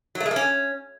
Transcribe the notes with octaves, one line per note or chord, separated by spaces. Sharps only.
F#3
A3
G#3
A#3
C#4